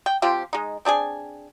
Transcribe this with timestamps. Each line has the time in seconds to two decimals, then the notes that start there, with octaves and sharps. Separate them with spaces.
0.06 G5
0.22 F3 C4 F4 G4
0.53 G#3 D#4
0.85 C4 D4 G#4 G#5